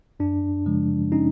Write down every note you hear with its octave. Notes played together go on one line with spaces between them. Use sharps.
F#2 D4
C#3 F3 G#3
C#4 D#4